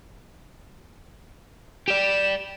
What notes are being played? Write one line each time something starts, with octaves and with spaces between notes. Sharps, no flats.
G4 D5 E7